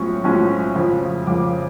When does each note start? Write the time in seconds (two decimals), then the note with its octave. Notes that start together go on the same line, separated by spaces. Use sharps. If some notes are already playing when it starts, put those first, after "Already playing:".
Already playing: B1 A2 F3 G#3 C#4 C#6
0.24 B1 A2 F3 G#3 C#4
0.75 F2 C#3 F3
1.27 F2 C#3 F3 D6